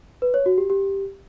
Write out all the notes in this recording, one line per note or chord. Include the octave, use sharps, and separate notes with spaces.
B4
C#5
F#4
G4
G4